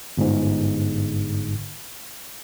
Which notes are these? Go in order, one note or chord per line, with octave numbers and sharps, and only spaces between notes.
G1 G#2